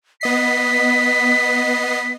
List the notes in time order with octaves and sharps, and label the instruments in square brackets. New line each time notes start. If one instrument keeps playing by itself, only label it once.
[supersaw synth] B3 D#5 C7 [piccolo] B6